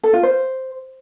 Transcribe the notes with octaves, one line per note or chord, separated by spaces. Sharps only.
A4
F4
C5